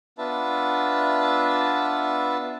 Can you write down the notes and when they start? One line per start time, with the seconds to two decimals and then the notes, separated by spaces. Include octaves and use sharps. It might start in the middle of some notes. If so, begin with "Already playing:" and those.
0.18 B3 D4 F4 B4 E5 A5